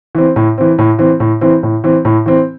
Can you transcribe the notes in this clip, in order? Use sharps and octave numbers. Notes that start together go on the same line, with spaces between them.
E3 C4
A2
E3 C4
A2
E3 C4
A2
E3 C4
A2
E3 C4
A2
E3 C4